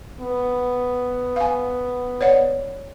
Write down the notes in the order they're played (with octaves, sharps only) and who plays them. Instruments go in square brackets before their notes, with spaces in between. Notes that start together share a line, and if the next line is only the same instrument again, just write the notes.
[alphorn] B3
[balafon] F5 G#5
C#5 D5 F#5